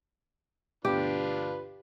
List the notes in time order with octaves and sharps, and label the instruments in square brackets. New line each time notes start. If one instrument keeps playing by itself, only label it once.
[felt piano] D2 G2 B2 [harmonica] D4 F4 B4 [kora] G4